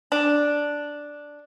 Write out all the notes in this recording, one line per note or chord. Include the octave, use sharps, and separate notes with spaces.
D4